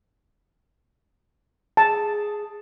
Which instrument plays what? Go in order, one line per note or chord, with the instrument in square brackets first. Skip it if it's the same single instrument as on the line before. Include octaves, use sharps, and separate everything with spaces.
[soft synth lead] G#4 [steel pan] A5